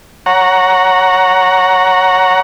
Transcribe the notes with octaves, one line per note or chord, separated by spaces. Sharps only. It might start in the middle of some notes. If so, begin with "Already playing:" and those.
C#5 F#5 A#5